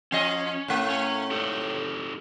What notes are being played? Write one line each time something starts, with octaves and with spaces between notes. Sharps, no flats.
F3 C#4 D#5
A2 A3
C#4
D#4 G4 A4